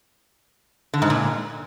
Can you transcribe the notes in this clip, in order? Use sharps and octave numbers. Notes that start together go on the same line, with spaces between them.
D3
G#2
A#2